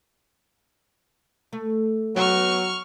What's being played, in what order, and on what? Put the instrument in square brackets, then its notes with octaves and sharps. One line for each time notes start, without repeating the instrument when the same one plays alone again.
[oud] A3
[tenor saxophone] F#3 [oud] B3 B4 [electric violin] C#6 F6